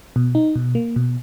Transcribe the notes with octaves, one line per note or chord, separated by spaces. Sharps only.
B2
D#4
B2
A#3
B2